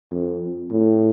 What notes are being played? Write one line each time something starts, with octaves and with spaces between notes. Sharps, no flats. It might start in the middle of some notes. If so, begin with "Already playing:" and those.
F2
A2